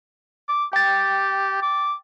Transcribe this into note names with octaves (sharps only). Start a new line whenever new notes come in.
D6
G4 G5 A6
D6